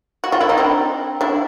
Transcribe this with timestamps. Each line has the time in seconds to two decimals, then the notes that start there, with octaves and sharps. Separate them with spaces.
0.24 F#4
0.32 F4
0.41 E4
0.49 D#4
0.58 C4 D4
1.21 D4 E4